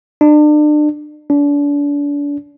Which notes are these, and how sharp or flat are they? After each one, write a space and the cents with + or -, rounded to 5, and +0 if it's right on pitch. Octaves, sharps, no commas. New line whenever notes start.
D4 +35
D4 -35